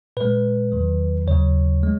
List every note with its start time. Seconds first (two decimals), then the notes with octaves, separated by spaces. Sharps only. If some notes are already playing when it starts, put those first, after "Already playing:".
0.17 A#2 G#3 B4
0.72 E2 D#3 F#3
1.27 D#2 C#3 F#3 C#5
1.83 G#3